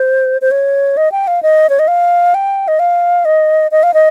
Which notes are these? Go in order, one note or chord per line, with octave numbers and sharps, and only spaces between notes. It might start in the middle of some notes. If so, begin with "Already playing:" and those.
Already playing: C5
C5
C#5
D#5
G5
F5
D#5
C#5
D#5
F5
G5
D#5
F5
D#5
D#5
F5
D#5